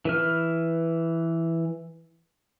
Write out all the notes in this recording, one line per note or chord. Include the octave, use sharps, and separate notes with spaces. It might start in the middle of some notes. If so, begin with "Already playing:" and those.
E3 B4 F6